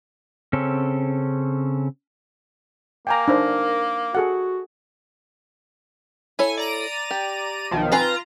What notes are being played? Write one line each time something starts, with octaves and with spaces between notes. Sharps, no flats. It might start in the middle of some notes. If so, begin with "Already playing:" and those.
C#3 C4 C#4 A4
A#3 G5 G#5 A#5
D4 D#4 A#4 C5
F#4 G#4 A4 F#5
E4 A4 C#5 G#5
D5 A#5 D#7
G4
B1 D#3 F3
C4 F4 B4 G#5 A#5